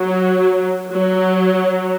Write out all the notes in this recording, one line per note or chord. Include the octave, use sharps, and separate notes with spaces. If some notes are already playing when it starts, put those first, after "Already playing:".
Already playing: F#3
F#3